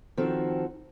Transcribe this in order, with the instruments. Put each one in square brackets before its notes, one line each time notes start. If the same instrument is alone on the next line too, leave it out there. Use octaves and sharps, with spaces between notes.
[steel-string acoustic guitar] D#3 F3 C4 F#4 A4